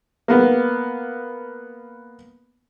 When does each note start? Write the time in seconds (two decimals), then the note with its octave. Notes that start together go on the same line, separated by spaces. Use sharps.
0.28 A#3 B3